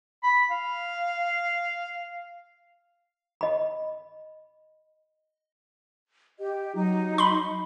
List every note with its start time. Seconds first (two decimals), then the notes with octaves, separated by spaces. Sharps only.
0.23 B5
0.51 F5
3.41 D#5 B5
6.39 G4 D#5
6.75 F#3 D#4
7.18 B5 C6